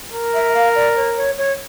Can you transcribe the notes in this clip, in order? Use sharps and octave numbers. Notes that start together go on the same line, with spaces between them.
A#4
E5
F5
D5
C#5
C#5
C#5